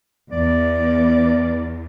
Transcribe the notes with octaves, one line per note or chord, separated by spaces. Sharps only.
E2 D5